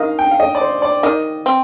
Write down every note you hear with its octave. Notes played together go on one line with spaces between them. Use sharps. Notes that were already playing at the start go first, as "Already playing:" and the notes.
Already playing: D#3 D#5 F5
G5
F5
D#5
D5
C5
D5
D#3 D#5
C4